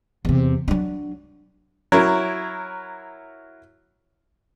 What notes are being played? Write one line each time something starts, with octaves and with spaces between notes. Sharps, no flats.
E2 C3
F#3 D4
F#3 E4 A#4 C#5